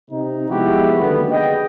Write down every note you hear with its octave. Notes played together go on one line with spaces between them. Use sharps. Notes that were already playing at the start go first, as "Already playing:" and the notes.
C3 D#4
F3 G#3 B3 E4 F#4 G4
F#1 D#2 D3 B3
G#4 D#5 G5